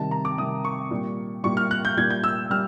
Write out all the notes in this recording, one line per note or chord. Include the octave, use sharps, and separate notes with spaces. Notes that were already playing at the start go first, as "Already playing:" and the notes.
Already playing: C3 D#3 G3 A5
A#5
D6
C3 D#3 G3 D#6
C#6
A#2 G3
A#2 G3 C#6
F6
F#6
G6
A#2 G3 G#6
G6
E6
G3 F6